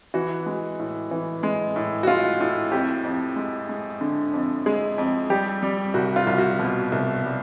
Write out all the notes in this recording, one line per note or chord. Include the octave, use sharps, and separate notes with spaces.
E3 F#4
G#3
A2
E3
G#3
A2
F#4
G#3 F4
A2
F2 G4
F2
G#3
G#3
D3
F2
G#3 G#4
F2
G3 G4
G3
C2 F#4
F4
C2
F#4
B2
C2
G3